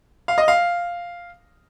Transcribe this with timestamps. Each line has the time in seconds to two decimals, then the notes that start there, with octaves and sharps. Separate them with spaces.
0.28 F5
0.38 D#5
0.48 F5